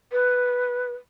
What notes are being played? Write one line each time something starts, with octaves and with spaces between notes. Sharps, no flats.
B4